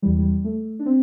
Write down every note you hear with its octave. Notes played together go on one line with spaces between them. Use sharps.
E2 C3 E3 G3
G3
A3
D4
C4